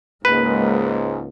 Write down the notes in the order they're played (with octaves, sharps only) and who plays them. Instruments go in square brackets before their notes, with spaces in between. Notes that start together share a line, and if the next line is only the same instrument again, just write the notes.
[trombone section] C#2 G#2 [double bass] G#3 A#3 [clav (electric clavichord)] B4